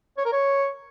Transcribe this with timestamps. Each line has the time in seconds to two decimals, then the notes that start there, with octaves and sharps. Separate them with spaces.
0.18 C#5
0.25 A#4
0.32 C#5